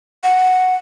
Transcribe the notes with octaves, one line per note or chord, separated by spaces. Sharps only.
F#5